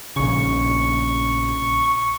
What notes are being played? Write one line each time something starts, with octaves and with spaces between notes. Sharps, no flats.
A#1 C#3 C#6